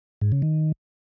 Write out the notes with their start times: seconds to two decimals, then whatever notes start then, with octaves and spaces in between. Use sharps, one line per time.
0.21 G#2
0.32 C#3
0.42 D#3